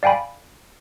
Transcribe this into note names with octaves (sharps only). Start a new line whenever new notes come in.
D5 F5 G5 G#5 B5